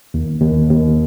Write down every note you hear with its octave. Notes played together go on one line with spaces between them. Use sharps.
D#2
D#2
D#2